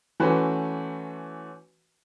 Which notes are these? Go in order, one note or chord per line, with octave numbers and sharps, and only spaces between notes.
E3 A3 C#4 F#4 B4 C5